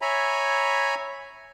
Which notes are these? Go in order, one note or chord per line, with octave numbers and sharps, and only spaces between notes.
C#5 E5 G#5 A#5 B5